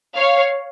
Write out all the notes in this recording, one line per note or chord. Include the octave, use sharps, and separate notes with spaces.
C#5 F5